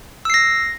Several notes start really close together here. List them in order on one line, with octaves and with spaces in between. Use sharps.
E6 C7 A#6